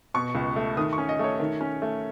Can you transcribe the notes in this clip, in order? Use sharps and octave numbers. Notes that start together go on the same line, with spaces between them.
B2 C#6
C#2
A3
D#3 D#6
C#6
C#4
D#5
A3 C#5
D#3
C#4
A3